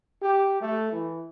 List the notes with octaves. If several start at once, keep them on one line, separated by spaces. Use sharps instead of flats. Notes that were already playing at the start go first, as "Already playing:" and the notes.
G4
A3
E3